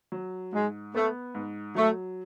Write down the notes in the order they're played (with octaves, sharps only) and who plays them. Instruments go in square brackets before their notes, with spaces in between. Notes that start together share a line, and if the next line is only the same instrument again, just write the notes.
[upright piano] F#3
[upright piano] G#2 [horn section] G#3
[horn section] A3 [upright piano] B3
[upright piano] G#2
[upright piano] F#3 [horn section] A3